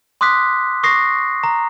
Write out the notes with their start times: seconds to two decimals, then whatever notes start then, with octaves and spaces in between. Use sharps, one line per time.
0.21 C6 D6 D#6 F#6 B6
0.83 C#6 D#6 A#6 C7
1.43 A#5